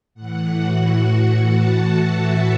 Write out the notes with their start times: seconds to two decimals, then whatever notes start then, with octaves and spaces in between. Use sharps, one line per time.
0.15 A2 F#5
0.20 E3
0.58 F#4
1.45 A5
2.18 E5